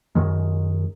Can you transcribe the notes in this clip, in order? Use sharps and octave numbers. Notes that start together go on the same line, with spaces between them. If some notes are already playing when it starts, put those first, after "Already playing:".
F#2 D#3 G#3